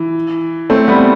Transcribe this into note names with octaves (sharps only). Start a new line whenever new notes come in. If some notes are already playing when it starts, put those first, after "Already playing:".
Already playing: E3
A3 C4
G3 B3